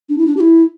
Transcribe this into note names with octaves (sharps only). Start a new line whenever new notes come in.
D4
E4
D4
G4
E4